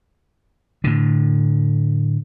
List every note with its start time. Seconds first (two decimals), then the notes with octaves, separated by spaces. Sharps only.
0.84 A2 D3